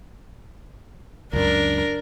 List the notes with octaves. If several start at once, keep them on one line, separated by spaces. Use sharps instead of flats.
C#2 F#2 D4 A#4